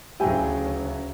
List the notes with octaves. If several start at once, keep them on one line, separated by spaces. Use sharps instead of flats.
D2 C#3 F#3 E4 G4 G#5